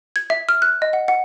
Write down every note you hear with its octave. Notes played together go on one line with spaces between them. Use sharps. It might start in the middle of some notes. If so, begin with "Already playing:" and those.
G#6
E5
F6
F#6
D#5
F#5
F#5